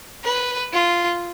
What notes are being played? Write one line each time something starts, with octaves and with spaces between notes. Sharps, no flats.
B4
F4